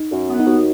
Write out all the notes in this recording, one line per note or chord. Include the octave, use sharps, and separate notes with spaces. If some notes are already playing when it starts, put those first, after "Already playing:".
Already playing: D#4
F#2
B3
D#4
D#2 F#4